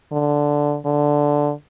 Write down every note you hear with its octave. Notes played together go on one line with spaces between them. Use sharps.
D3
D3